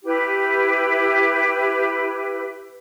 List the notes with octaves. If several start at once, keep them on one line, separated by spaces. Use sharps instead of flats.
E4 G4 B4